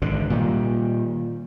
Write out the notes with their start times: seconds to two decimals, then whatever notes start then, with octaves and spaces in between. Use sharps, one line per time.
0.02 G#1 B2 D3
0.30 A#2 D#3 G3